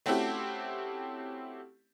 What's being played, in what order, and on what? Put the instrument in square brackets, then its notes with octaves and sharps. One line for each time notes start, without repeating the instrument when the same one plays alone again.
[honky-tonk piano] A3 C4 C#4 E4 F#4 G4